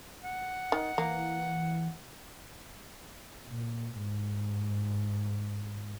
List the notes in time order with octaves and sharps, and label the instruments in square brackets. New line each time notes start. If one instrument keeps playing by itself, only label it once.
[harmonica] F#5
[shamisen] D#3
[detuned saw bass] E3 [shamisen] A#3
[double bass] A#2
G#2